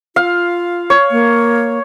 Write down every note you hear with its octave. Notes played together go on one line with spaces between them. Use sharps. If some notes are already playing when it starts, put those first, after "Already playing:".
F4 F5
C#5
A#3